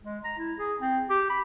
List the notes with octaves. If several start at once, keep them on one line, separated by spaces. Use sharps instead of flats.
G#3
A#5
E4
G#4
C4
G4
B5